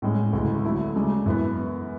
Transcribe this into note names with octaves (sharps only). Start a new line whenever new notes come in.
A2 G#3 C#4
D2 C#3 E3 G#3
D3 F#3 A3 E4
C#3 G#3 D4
F#2 E3 B3